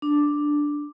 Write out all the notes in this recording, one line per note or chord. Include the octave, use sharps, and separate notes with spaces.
D4